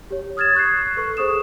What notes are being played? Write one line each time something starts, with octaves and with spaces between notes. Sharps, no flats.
G4 C#5
D#6 F6 G#6 A6 E7
C#6 F#6 G#6 C7
A4 B4 C#6
G#4 C5 C#6 D#6 E7